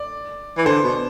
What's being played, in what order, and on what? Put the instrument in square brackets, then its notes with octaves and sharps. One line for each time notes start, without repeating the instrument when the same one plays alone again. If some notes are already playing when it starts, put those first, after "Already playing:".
Already playing: [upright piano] D5
[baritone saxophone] E3
[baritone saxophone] D3 [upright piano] C5
[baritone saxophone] B2